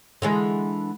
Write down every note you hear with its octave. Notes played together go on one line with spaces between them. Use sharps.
D3 E3 G#3